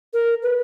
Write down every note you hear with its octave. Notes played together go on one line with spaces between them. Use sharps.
A#4
B4